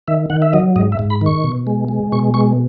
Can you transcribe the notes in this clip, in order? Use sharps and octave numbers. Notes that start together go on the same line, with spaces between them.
D#3 E5
D#3 F#5
E5
F#3 D#5
G#2 D#5
E5
G#2
B5
D#3 C#6
B2
G#3
G#3
B2 C#6
G#3 C#6